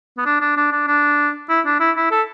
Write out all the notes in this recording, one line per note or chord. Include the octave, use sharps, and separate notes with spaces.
B3
D4
D4
D4
D4
D4
E4
D4
E4
E4
A4